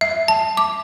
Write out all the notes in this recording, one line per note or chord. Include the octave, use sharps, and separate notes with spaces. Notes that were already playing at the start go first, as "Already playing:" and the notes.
E5
A5
D6